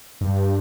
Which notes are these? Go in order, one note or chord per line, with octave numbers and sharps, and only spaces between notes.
G2